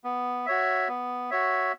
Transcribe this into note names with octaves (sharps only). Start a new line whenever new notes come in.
B3
F#4 C#5 E5
B3
F#4 C#5 E5